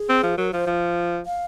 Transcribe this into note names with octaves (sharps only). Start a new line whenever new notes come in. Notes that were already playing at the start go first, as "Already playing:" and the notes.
Already playing: G#4
C4
F3
F#3 A#4
F3 C5
F3
F5